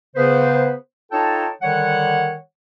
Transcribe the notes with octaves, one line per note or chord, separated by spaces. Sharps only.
C#3 B3 B4 C5
D#4 F4 A4 C#5 G5 A5
D3 D#3 G3 C#5 F#5